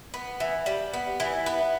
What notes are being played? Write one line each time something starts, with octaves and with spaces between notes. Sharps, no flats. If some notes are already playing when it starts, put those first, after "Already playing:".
B3
E3
G3
B3
E3
B3